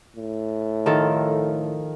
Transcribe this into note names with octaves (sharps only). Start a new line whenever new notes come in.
A2
D#3 F3 A4